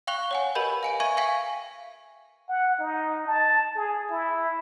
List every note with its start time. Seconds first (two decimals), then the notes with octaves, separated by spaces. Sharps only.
0.07 F5 G5 C#6 F#6 F7 G7
0.31 C#5 F#5 G#5
0.55 G4 A#4 B4 D#5 B5 G6
0.83 F5 G#5 D7
1.00 E5 G#5 C#6 G#6 D#7
1.17 E5 F5 G5 G#5 C#6 B6
2.49 F#5
2.79 D#4
3.27 A5
3.76 G#4
4.10 E4